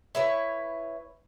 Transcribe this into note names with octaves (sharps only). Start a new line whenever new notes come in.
E4 B4 C#5